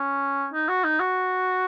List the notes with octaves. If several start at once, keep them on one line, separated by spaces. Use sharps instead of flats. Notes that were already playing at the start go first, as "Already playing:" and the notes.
Already playing: C#4
D#4
F#4
D#4
F#4